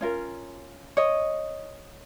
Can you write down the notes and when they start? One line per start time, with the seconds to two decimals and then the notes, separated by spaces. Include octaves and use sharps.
0.01 C#4 F4 A#4
0.97 C#5 D#5